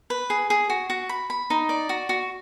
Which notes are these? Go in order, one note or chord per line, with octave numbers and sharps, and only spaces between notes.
B4
G#4
G#4
F#4
F#4
B5
B5
D#4
D5
F#4
F#4